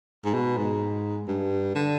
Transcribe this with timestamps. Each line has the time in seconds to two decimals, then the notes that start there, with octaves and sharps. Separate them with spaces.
0.25 G#2
0.34 B2
0.57 G#2
1.28 G2
1.75 D3